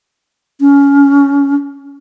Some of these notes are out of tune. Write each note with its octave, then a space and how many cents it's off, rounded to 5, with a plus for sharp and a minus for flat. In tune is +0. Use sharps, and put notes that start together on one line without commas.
C#4 +20